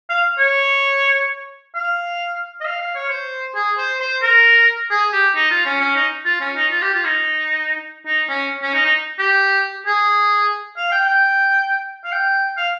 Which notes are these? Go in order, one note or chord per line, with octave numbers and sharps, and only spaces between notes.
F5
C#5
F5
D#5
F5
F5
C#5
C5
G#4
C5
C5
A#4
G#4
G4
D#4
F4
C#4
C#4
D#4
F4
C#4
D#4
F4
G4
F4
D#4
D#4
C#4
C#4
D#4
D#4
G4
G#4
F5
G5
G5
F5
G5
F5